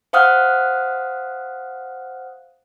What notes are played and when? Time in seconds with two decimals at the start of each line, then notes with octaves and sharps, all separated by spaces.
0.13 C5 F5 F#5 D#6 F6 F#6